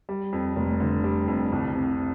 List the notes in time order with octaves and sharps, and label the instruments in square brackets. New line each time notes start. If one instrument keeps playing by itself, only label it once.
[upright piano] G3
F2
F1
D3
G3
F2
C2
C3